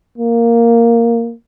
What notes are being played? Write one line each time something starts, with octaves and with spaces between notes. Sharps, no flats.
A#3